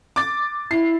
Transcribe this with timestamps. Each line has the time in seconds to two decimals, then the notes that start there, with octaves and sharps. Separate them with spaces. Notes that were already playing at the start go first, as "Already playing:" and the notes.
0.16 D6 A6
0.71 E4 C7